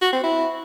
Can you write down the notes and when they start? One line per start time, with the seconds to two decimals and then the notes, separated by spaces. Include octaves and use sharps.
0.02 F#4
0.13 C4
0.24 E4